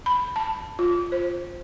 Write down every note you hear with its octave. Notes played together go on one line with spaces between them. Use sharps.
B5
A5
F4
C5